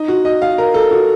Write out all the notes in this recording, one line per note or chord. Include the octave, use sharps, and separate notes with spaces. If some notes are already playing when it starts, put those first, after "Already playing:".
Already playing: D#4
F#4
D#5
F5
A#4
A4
F#4